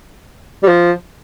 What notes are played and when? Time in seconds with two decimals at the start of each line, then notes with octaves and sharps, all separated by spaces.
0.63 G3
0.68 F3